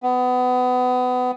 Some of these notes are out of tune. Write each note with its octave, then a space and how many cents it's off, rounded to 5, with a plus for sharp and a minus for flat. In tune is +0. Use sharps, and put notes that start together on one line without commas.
B3 +25